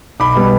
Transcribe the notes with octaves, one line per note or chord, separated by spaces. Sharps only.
B1 B5 D6
B2 G3 B3